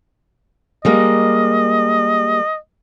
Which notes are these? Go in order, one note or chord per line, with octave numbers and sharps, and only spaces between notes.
G3 G#3 A#3 D#5